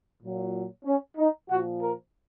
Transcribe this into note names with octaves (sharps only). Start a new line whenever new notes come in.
A#2 F#3
C#4
D#4
A#2 F3 F#4
A#4